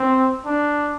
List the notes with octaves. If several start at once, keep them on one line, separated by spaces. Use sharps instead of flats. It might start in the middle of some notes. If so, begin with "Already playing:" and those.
Already playing: C4
D4